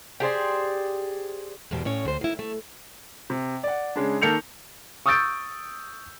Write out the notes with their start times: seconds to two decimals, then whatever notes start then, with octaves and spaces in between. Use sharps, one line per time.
0.20 G4 G#4 C5 D5
1.71 E2 G#2 B2 A#3 G4
1.85 A2 C#4 C#5
2.05 D2 C5
2.21 D#3 E4
2.39 A3
3.30 C3
3.63 D5 F#5
3.96 C#3 G#3 D4
4.22 D#3 A#3 A4 G6 C#7 F7
5.06 C#6 D#6 E6 G6 A6 D7